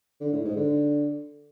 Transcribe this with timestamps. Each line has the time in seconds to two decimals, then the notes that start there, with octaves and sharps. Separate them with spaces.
0.21 D3
0.33 A2
0.45 G#2
0.56 D3